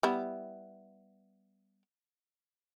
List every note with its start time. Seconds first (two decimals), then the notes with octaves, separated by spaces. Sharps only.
0.03 G3 B3 E4